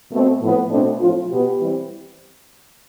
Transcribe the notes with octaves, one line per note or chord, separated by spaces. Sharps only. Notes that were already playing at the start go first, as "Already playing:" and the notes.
B2 A3 C4
A2 F3 B3
B2 A3 C4 D4
A2 F3 C4 F4
B2 B3 G4
E3 G3 C4